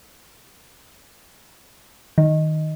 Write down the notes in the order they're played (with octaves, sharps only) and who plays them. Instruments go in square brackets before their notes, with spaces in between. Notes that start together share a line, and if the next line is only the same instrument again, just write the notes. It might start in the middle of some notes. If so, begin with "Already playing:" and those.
[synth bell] D#3